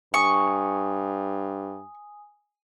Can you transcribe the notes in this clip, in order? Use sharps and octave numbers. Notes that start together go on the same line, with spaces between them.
G2 G#5 C#6 D#6